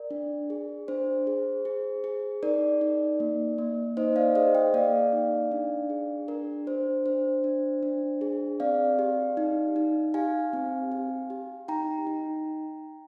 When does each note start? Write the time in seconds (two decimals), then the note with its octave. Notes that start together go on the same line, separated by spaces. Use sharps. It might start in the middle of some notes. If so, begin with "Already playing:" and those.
Already playing: A#4 D5
0.11 D4
0.50 G#4
0.88 D4 C5
1.27 G#4
1.65 G#4
2.04 G#4
2.43 D#4 A#4 D5
2.81 D#4
3.20 A#3
3.58 A#3
3.97 D#4 C5 D#5
4.16 D5 F5
4.35 G#4 C5 D#5
4.55 D#5 G5
4.74 A#3 D5 F5
5.13 D#4
5.52 D4
5.90 G#4
6.28 D4 A#4
6.67 D4 C5
7.06 D4 C5
7.44 D4
7.83 D4
8.21 G#4
8.60 C4 D5 F5
8.99 G4
9.37 D#4
9.76 D#4
10.14 G4 F5 G#5
10.53 C4
10.92 G4
11.30 G4
11.68 D#4 G5 A#5
12.07 D#4